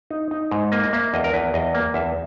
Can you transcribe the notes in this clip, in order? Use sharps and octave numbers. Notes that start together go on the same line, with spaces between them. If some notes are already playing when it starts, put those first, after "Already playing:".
D#4
D#4
G#2
A#3 D#5
D#5
A#3 E5
E2 D#5
A#4
E2 B4
E2 D#5
A#3
E2 E5